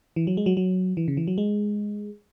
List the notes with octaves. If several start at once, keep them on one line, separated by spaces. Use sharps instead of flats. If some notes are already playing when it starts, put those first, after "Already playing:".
E3
F#3
G#3
F#3
F#3
E3
C#3
E3
F#3
G#3